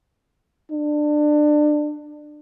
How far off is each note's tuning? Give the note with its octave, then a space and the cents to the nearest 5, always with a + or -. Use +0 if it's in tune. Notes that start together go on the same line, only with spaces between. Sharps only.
D4 +25